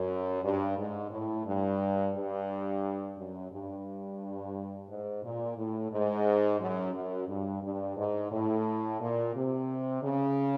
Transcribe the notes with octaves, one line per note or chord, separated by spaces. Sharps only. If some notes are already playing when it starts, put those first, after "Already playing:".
Already playing: F#2
G2
G#2
A2
G2
G2
F#2
G2
G#2
A#2
A2
G#2
F#2
F#2
G2
G2
G#2
A2
A#2
C3
C#3